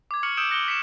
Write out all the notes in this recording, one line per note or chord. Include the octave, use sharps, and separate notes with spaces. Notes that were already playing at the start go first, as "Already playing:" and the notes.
D6 G#6
C#6 F6 C#7 F#7
D#6 E6 G6 D7 E7
D#6 F#6 A#6 C#7 F#7 G7
B6 C#7 E7